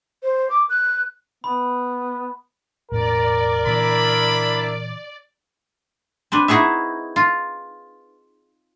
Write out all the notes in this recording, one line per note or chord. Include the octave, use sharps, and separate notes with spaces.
C5
D6
F#6
B3 B5
E1 A2 A#4 D5
A#2 C#3 E3 D4 E4 B5
C4 D4 B4
D#4 E4 F#4 G#4 E5
F4